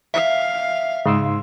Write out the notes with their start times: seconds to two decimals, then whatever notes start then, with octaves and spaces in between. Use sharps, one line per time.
0.14 E5 F5
1.06 G#2 C#3 C6 E6